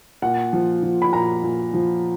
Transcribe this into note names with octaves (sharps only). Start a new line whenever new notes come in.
A#2 F#5
F3
F3
B5
A#2 A#5
A#2
F3